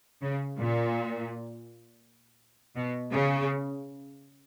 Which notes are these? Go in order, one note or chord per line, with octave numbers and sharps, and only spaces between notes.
C#3
A#2
B2
C#3